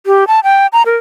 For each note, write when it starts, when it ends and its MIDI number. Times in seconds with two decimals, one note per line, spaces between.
0.06 0.27 67
0.27 0.40 81
0.44 0.67 79
0.73 0.83 82
0.86 0.97 70